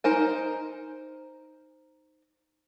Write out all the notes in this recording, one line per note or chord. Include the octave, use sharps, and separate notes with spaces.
D#4 A#4 C5 G#5